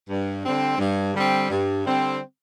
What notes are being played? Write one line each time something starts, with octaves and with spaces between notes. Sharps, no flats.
G2
D3 G3 C4
G2
D3 G3 C4
G2
D3 G3 C4